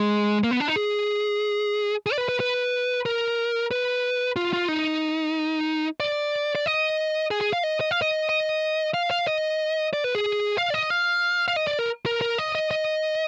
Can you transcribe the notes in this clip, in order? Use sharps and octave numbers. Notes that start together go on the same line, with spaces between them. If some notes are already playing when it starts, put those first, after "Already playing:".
Already playing: G#3
A#3
B3
D4
D#4
G#4
G#4
D5
B4
B4
B4
A#4
B4
F4
F4
D#4
D5
D5
D#5
G#4
G#4
F5
D#5
D#5
F5
D#5
D#5
F5
F5
D#5
D5
B4
G#4
F5
D5
D#5
F5
F5
D#5
D5
A#4
A#4
A#4
D#5
D#5
D#5